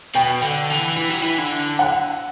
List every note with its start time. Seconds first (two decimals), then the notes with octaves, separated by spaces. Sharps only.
0.15 B2 G5
0.42 D3
0.70 E3
0.97 E3
1.09 F#3
1.22 E3
1.38 D3
1.79 F#5